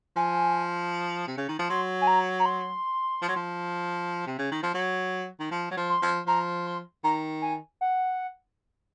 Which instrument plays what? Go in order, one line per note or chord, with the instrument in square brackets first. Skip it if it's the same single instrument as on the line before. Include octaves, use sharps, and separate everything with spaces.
[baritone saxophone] F3 [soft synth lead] G#5
[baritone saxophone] C3
C#3
D#3
F3
[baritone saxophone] F#3 [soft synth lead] C6
[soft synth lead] G#5
A#5
A#5
C6
[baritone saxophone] F3
F#3
F3
C3
C#3
D#3
F3
F#3
D#3
F3
F#3
F3
[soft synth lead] C6
[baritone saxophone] F3
[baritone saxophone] F3 [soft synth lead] A#5
[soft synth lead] C6
[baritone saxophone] D#3 [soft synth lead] A#5
[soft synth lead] G#5
F#5